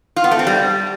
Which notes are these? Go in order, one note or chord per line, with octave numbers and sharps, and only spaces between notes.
F4
B3
A3
C4
G3